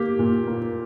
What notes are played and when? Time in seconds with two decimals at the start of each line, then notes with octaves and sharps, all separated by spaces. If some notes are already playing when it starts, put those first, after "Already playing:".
Already playing: A#3 G4
0.19 A#2
0.48 A#3